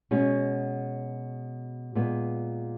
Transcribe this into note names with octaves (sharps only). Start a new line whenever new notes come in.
B2 G#3 C#4 F#4
A#2 G#3 B3